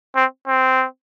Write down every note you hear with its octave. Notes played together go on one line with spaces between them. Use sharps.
C4
C4